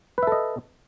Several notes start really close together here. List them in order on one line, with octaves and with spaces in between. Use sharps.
B4 E5 A4 D#5